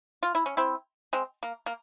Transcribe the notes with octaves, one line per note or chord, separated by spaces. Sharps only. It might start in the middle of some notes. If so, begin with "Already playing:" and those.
F4
E4
C#4
C4 E4
G#3 C4
A#3
A#3